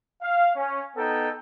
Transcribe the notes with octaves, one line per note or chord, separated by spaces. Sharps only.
F5
C#4
B3 D#4 A4 G5